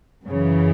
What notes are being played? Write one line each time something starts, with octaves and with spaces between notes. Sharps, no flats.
F#2 C#3 E3